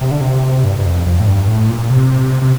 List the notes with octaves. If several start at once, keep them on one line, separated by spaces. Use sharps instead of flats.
C3
D3
C3
G2
G2
F2
F2
A2
G2
A2
A#2
C3
C3